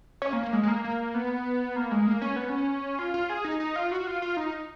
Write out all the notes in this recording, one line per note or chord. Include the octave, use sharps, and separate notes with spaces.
C#4
A#3
A#3
G#3
G#3
A#3
A#3
B3
A#3
G#3
A#3
C#4
B3
C#4
F4
F4
G#4
D#4
D#4
F4
F#4
F4
F4
D#4